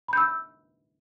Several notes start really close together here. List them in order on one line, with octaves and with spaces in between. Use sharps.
B5 G6 E6